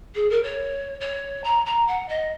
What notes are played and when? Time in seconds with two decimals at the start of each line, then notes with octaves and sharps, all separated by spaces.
0.15 G#4
0.30 A#4
0.43 C#5
1.00 C#5
1.44 A#5
1.66 A#5
1.87 F#5
2.08 D#5